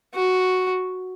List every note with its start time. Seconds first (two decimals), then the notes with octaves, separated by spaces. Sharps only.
0.14 F#4